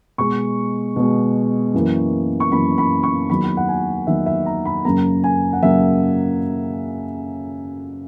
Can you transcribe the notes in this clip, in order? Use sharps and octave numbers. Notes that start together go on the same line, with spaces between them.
B2 G#3 C#6
B2 G#3
F#2 E3 A#3
C#6
F#2 E3 A#3 B5
B5
C#6
E2 D#3 F#3 A#3 B5
F#5
G#5
E2 D#3 F#3 A#3 E5
E5
A#5
B5
F#2 C#3 F#3 A#3 A#5
G#5
F#5
F#2 C#3 F#3 A#3 E5